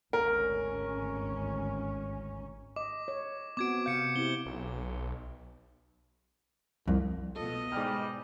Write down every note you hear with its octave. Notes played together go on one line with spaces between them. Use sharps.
G#1 D2 C#4 A#4
D#5 D6
C#5
B3 C4 F#4 D6 G#6 D7
C3 F5 G6 C#7 D7
C4 E4 G4 G7
B1
C2 F2
B2 F4 A4 D#5
G#2 G3 B4 G5 F6